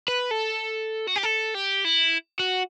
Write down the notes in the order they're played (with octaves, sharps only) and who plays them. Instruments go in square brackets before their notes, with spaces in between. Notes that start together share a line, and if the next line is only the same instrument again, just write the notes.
[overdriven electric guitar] B4
A4
F#4
G4
A4
G4
E4
F#4